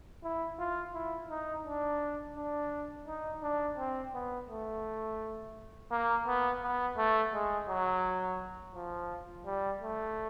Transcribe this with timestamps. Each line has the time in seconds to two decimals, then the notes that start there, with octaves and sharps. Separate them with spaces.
0.24 E4
0.59 F4
0.94 E4
1.29 D#4
1.65 D4
2.37 D4
3.07 D#4
3.43 D4
3.78 C4
4.14 B3
4.49 A3
5.91 A#3
6.27 B3
6.62 B3
6.97 A3
7.33 G#3
7.69 F#3
8.75 F3
9.46 G3
9.82 A3